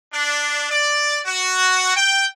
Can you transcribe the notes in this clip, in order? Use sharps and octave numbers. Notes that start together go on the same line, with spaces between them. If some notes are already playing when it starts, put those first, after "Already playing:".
D4
D5
F#4
G5